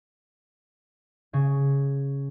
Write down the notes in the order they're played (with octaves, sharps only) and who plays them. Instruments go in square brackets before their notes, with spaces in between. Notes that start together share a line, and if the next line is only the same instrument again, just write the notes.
[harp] C#3 G#6